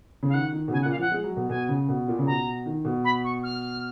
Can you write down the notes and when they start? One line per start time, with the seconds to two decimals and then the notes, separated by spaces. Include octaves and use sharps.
0.23 C#3
0.29 F5
0.33 D#3 F#5
0.52 D#3
0.68 B2
0.73 C#3 G#5
0.82 F#5
0.85 A#2
0.91 F5
0.98 F3 F#5
1.11 G#3
1.24 F#3
1.37 B2
1.49 B2 G#5
1.69 C#3
1.89 B2
2.08 A#2
2.19 C#3
2.27 B2 A#5
2.66 D#3
2.85 B2
3.04 B5
3.24 C#6
3.44 F6